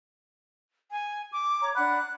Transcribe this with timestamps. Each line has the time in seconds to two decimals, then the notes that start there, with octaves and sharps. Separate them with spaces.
0.91 G#5
1.32 D6
1.61 C#5 A#5
1.75 D4 F#5 B5 F#6